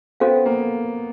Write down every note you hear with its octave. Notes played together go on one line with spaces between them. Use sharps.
B3 C#4 F#4 A4 C5 F5
A#3